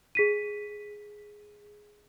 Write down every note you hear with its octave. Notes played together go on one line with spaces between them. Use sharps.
G#4 B6 D#7